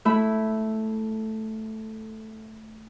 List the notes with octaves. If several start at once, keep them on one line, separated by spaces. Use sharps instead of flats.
A3 E4 E5 B5